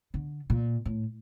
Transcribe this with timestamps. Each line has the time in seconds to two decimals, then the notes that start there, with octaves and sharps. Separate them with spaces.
0.14 D3
0.50 A#2
0.86 A2